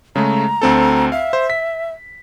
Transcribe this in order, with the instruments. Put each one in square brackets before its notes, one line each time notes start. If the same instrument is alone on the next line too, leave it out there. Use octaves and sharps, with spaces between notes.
[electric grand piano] C#3 G#3 A3 [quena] A#5
[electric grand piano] D2 C4 A4
[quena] E5 [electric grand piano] F5
[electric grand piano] C5
B6